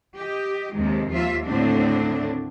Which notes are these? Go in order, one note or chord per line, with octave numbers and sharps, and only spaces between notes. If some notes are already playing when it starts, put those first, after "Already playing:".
G4 D#5
D#2 C3 D#3 G#3
D#2 F3 F4 E5
D#2 A2 D3 A3 C4 D4